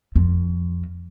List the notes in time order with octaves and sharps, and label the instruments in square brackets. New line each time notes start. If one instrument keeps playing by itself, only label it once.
[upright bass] F2